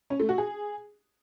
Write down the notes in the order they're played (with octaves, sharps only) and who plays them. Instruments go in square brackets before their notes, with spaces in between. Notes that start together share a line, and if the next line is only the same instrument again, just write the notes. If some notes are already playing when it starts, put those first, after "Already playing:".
[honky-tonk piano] C#4
A3
F#4
G#4